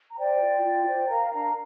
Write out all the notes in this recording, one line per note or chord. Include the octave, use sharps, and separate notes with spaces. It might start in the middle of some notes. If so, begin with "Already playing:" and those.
A#5
C5 D5 G5
F4
F4
C5
A#4 F5 A#5
D4 F5 A#5